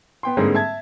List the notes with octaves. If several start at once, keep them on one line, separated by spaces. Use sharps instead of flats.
B3 G5 C6
G#2 D3 G3 G#3 A#3 C4
E5 A5 G#6